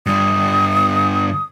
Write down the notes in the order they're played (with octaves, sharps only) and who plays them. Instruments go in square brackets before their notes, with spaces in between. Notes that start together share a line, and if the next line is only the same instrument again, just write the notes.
[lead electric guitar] G2 D3 [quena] D#6